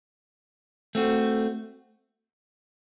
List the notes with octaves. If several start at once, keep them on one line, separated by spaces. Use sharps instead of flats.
A3 C4 F#4